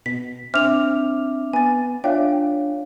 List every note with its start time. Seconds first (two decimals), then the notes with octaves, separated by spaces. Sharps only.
0.06 B2 B6
0.54 C4 D4 E5 D6 F6 F7
1.53 B3 G#5 A6
2.04 D4 F4 C#5 E5 F5 G5